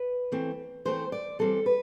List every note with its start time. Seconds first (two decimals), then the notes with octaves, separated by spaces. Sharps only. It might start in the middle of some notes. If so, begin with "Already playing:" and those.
Already playing: B4
0.32 E3 A3 C4
0.85 E3 A3 C4 C5
1.12 D5
1.39 E3 G3 C4 A4
1.66 B4